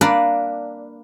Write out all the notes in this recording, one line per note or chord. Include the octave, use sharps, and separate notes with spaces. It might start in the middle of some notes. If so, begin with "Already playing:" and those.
A#3 D4 A#4 B4 D5